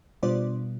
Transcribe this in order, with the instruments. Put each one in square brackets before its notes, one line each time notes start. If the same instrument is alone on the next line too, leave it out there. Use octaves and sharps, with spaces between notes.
[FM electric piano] B2 G3 B3 D4 F4 C5 D5